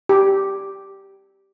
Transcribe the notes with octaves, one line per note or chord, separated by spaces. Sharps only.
G4